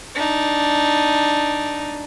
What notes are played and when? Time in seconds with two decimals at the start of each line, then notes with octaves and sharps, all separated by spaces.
0.15 D4 D#4